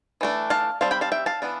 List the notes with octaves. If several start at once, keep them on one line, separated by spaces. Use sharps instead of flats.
E3 A3 D4
F5 A5
G3 C4 F5 A5
G5 B5
F5 A5
E5 G5
F5 A5
E3 B3 D4